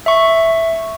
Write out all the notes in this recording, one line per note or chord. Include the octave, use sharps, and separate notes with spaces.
E5 C#6